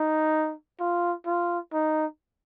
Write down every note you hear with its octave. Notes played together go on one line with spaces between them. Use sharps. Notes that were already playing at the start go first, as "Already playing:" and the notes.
Already playing: D#4
F4
F4
D#4